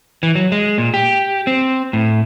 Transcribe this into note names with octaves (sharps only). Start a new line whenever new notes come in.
E3
F#3
G#3
A#2
G4
C4
A2